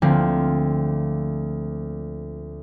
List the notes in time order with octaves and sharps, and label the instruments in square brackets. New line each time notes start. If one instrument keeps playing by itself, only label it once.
[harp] D2 D3 F3 A#3 C4